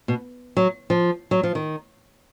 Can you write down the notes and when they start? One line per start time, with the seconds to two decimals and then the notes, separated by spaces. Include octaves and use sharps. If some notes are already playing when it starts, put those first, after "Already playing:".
0.08 B2
0.57 F#3
0.90 F3
1.31 F#3
1.43 F3
1.55 D#3